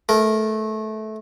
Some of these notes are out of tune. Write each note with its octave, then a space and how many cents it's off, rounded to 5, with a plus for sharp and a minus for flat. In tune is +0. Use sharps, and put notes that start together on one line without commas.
A3 -20 A#4 +0